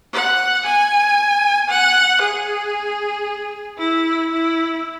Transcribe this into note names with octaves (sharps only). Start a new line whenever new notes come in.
F#5
G#5
F#5
G#4
E4
E4